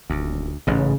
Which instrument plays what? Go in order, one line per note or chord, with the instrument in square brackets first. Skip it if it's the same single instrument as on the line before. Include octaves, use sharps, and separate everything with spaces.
[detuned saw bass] D#1 [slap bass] D2
[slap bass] A1 G#2 [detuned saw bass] C#3